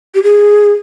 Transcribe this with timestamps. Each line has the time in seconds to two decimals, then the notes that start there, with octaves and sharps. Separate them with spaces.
0.15 G4
0.23 G#4